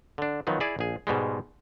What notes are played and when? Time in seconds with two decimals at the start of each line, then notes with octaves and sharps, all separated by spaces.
0.18 D3 D4
0.47 D#3 F3 F#3 B3
0.60 E4 G#4 D5
0.79 A#1 G#4
1.07 G#2 B2 G3 G#3